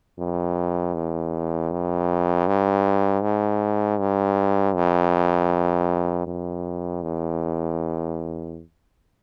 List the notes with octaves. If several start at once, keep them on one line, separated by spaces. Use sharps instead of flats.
F2
E2
F2
G2
G#2
G2
F2
F2
E2